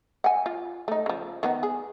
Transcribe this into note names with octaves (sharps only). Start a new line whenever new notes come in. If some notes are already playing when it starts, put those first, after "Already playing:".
F#5 G#5
F4
A3 D#4
C#3 F3
D#3 B3 D#4
G#4